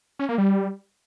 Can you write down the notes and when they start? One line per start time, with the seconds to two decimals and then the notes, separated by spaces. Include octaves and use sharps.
0.19 C#4
0.29 A#3
0.38 G3